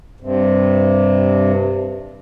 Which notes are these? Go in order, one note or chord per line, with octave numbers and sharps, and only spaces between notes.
G2 C3